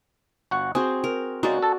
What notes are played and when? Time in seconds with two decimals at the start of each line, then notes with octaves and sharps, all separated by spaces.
0.51 G1 F#4 F#5
0.75 C4 F#4 G#4
1.04 A#4
1.43 C#3 G#3 D#4 F#4 D5
1.62 A4 A5